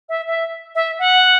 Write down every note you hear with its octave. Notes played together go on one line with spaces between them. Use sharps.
E5
E5
E5
F#5